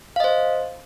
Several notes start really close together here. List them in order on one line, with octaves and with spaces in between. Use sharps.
F5 D#5 C5